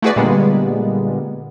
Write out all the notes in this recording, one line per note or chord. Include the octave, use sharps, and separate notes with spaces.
A3 E4 F#4 G#4 B4 D5
A#2 D3 G3 G#3 A#3 B3